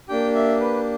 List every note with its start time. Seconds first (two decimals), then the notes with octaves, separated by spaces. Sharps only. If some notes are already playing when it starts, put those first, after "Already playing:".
0.08 A#3 D4 G4 G5
0.35 E5
0.60 B4